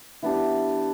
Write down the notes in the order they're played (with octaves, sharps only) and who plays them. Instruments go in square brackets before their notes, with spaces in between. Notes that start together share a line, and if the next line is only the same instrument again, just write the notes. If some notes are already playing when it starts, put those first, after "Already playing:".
[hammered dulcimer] E3 B3 D4 G4